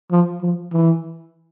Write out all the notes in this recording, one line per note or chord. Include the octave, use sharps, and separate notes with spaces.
F3
F3
E3